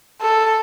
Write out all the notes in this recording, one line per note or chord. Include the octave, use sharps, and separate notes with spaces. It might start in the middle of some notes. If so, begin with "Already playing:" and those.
A4